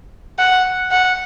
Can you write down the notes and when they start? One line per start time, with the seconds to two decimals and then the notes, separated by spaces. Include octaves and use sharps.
0.39 F#5
0.91 F#5